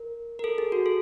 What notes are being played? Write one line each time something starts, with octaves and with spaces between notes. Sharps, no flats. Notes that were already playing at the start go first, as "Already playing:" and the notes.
Already playing: A#4
A#4
A4
G#4
F#4
A4